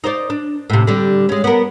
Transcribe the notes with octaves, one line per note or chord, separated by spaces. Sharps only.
D#4 C5 D5
D4
A2 C3
D3 G3
G#3 C#4
B3 A#4